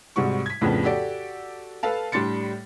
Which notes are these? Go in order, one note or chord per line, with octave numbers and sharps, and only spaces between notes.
G#2 C3 G3 F#4 C#6
G#6 B6
F2 A2 C#3 F3 B3 D4
F#4 G4 A4 D5
A4 B4 F5 A5
A2 G3 D4 C6 A6 C#7